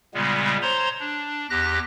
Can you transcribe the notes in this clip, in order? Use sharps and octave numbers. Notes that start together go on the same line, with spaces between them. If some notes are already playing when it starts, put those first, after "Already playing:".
A#2 C#3 G3 G#3 B3
C5 C#5 A#5 C6
D4
E2 G4 F#6 A#6